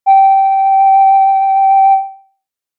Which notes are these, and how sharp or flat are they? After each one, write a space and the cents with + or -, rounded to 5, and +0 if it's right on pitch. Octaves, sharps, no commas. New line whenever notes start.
G5 -15